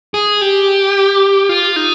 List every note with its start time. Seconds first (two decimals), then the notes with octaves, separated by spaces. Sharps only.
0.14 G#4
0.41 G4
1.49 F4
1.76 D#4